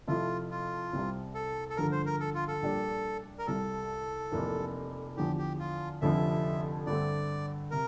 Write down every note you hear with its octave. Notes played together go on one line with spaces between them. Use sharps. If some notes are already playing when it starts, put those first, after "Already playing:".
F2 C3 F3 A3 E4 F4
F4
C2 C3 G3 C4
A4
A4
G2 D3 F3 A3 A#4
C5
A#4
A4
F4
A4
A#1 A#2 G3 D4 G4
A#4
C2 C3 G3 A4
F1 F2 C3 E3 A#3
E2 D3 F3 G4
G4
F4
F1 F2 D3 F3 C4 E5
G2 D3 A3 C4 D5
C3 A#4